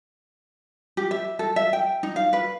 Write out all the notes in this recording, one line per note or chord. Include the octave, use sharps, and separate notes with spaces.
G4
E5
A4
E5
G5
D#4
F5
B4